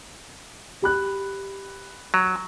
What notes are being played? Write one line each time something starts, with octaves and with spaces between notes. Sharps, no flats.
G4 B5 F#6
F#3